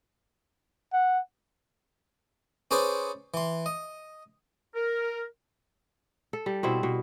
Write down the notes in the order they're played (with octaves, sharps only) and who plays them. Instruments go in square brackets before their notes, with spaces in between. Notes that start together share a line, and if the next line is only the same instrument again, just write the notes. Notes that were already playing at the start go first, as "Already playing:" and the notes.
[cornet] F#5
[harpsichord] C#4 G#4 B4 C5 D5
E3 C6
D#5
[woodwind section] A#4
[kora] A4
G3
B2 C4 E4
B2